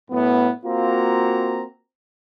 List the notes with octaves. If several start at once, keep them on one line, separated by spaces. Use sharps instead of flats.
F#2 A2 B3
A#3 C4 F4 F#4 A#5